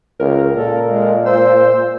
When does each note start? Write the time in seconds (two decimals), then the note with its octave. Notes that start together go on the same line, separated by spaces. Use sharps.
0.20 C#2 A#4
0.57 A#2 A4
0.86 G#3
1.26 C5 E6